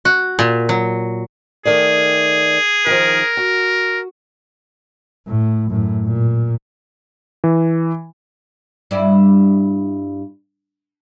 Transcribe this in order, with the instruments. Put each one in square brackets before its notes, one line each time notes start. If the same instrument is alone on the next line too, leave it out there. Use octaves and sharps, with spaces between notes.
[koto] F#4
A#2
F#3
[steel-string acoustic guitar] D#3 A3 D5 [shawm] G#4
[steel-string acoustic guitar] D#3 F3 [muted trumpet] A#4
[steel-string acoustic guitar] F#4
[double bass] A2
F#2 A2
A#2
[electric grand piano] E3
[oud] G2 E4 D5